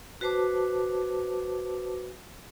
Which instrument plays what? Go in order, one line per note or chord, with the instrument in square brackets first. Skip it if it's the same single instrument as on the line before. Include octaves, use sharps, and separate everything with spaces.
[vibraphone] F#4 B4 C5 A5 D6